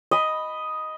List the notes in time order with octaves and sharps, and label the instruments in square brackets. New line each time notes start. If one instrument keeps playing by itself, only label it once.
[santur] D#5 B5